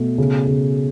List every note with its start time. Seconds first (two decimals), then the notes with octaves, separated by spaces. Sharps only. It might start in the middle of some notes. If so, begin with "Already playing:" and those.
Already playing: B2 A3
0.18 C#3
0.47 C#3